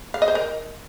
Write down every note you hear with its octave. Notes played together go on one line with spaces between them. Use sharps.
F5
D#5
C5
A#4